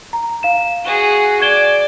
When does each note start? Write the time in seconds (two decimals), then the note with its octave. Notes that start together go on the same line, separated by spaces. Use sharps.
0.13 A#5
0.43 F5 E7
0.84 F#4 G#4
1.42 D5 G#6 E7 G7